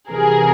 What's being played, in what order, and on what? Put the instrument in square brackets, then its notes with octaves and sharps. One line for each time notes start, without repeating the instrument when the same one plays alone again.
[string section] F2 C3 E3 G3 G#4 A#4